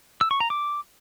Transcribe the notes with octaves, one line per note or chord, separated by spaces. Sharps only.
E6
C#6
A#5
D6